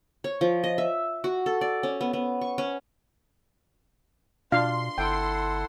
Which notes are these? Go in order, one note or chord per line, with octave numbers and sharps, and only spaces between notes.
C#5
F3
D#5
E5
F#4
A4
D5
C#4
B3
B3
C#6
C#4
B2 D4 F4 F5 C6
G1 E4 A4 F#5 G5